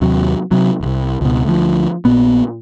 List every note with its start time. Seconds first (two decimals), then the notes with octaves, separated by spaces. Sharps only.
0.01 D#2 C3 F#3
0.51 C3 F#3
0.81 E1 C2
1.21 C#2 B2
1.45 D2 F3
2.05 A#1 A#2 B3